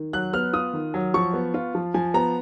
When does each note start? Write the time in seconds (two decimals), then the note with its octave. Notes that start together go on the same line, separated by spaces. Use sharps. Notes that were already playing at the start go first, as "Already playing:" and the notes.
Already playing: D#3
0.13 F#3 F#6
0.33 B3 F6
0.53 F4 D#6
0.74 D#3
0.94 F#3
1.14 F3 C#6
1.34 B3
1.54 F4
1.75 F3
1.94 F3 G#5
2.14 B3 A#5